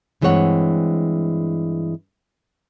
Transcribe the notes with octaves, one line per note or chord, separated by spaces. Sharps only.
G2 E3 G#3 C4 C#5 F#5